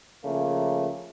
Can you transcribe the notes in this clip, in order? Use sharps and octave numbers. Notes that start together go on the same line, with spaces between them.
C#3 F3 A3 A#3